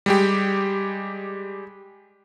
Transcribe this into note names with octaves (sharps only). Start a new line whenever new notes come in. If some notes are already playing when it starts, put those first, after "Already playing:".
G3 G#3 G4